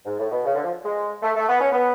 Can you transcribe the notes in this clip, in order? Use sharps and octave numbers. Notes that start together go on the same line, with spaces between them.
G#2
A2
B2
C#3
D3
F3
G#3
A3
A3
B3
C#4
B3